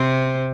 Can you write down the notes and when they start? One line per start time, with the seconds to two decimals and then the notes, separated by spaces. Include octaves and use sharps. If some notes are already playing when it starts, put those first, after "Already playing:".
Already playing: C3 C4